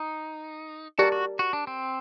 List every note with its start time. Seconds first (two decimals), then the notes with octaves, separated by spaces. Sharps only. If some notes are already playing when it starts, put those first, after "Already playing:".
Already playing: D#4
0.98 F#4 G4 A#4 D5 A5
1.12 F#4
1.39 F#4
1.53 D4
1.67 C4